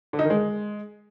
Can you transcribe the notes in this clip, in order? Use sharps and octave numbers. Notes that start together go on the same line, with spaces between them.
D3
D#4
D#3
G#3